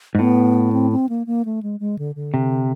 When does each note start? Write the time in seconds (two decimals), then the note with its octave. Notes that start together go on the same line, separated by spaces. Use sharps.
0.15 G#2
0.19 A2 B3
0.72 C4
0.91 C4
1.09 A#3
1.26 A#3
1.45 A3
1.63 G#3
1.80 G#3
1.98 D3
2.15 D3
2.34 C3